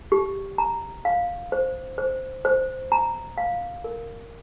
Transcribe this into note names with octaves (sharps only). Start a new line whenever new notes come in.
G4
A#5
F5
C5
C5
C5
A#5
F5
A#4